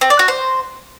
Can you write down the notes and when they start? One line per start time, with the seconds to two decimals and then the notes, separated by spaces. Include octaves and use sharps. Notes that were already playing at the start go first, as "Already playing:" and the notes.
0.01 C4
0.10 D5
0.19 F#4
0.28 C5